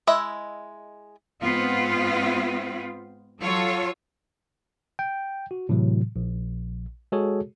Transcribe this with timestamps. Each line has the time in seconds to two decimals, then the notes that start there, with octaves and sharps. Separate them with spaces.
0.07 G#3 E4 D#5 E5
1.42 G#2 B3 C4 F4
3.40 F#3 F4 A4 C#5
4.99 G5
5.51 F#4
5.69 A2 C3 E3 F#3
6.16 A#1
7.12 G#3 F#4 G#4 A4 C#5